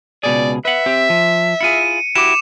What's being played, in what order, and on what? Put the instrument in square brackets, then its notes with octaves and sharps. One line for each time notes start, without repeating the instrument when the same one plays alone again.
[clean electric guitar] C#2 B2 G#4 [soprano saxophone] D5
[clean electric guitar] B4 F#5 [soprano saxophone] E5
[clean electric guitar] C4 G4
F3
[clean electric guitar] E4 F4 G#4 [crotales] C#7 D#7
[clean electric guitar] E4 F#4 G4 [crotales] D6 E7